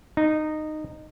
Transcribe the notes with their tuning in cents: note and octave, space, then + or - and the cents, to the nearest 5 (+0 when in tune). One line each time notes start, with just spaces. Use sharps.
D#4 -15